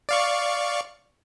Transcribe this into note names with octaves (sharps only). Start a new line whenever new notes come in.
D5 F5 C#6